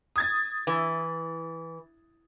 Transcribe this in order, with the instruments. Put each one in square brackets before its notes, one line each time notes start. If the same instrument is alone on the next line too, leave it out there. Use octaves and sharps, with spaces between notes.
[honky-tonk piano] D#6 G#6 A6
[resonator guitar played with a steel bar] E3